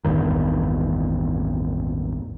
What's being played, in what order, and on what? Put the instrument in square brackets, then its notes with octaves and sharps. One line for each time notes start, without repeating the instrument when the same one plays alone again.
[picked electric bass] A1 E2 G2 D#3